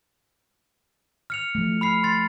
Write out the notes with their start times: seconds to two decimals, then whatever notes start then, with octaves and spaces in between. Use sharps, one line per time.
1.30 F6 C#7 F7
1.55 F3 A3
1.81 B5 F6 C7
2.03 C6 A6 C7